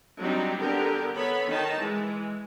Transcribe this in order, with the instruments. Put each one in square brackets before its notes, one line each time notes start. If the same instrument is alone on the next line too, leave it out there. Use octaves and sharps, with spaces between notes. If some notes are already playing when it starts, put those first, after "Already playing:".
[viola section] F#3 G3 C4 D4 D#4 G4
D3 B3 G4 A#4
B3 A4 C#5 B5
D#3 D#4 A5
E3 G#3